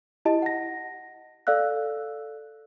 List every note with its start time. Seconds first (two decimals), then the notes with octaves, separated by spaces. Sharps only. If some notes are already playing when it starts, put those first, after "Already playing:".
0.25 E4 G4 D#5 A5
0.42 F#5 A#6
1.47 A4 D5 F5 E6 F#6